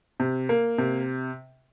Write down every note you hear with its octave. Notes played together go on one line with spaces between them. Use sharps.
C3
A#3
C3